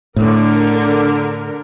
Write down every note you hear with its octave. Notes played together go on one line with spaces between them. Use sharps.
A2 D3 A#4